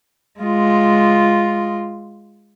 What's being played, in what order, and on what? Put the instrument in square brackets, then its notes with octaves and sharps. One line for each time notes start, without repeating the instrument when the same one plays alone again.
[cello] G#3 F4